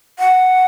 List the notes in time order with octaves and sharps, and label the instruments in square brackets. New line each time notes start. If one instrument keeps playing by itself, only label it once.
[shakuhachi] F#5